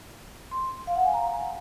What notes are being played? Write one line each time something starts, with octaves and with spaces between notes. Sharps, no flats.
C6
F5
F#5
G#5
A#5